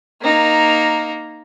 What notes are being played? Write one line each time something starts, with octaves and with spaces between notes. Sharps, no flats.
A#3 D#4